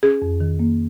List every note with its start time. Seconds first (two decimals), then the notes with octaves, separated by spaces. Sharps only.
0.03 C#4 G#4
0.22 F2
0.40 D#3
0.59 A#3